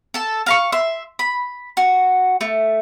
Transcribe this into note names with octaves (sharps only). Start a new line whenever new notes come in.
A4 A5
F5 A#5 C#6
E5 C6
B5
F#4
A3